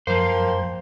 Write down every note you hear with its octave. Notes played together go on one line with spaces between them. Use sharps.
F#2 F3 A#3 C5 G5